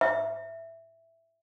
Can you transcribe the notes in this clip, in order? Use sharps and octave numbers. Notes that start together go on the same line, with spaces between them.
E5